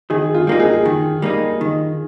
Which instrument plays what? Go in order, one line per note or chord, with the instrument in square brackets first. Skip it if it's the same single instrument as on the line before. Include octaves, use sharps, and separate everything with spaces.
[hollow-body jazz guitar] D#3 [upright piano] G#4
[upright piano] F4
[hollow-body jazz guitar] G3 A#3 D#4
[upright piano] G#4
[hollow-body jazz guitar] D#3
G3 A#3 D#4
D#3